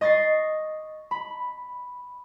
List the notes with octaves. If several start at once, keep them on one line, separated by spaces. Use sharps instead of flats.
D#5 C#6 A6 A#6 C7
B5